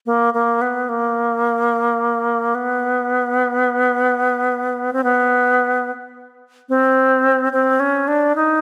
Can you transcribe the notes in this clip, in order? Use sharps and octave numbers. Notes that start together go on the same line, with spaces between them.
A#3
A#3
B3
A#3
B3
C4
B3
C4
C4
C#4
D4
D#4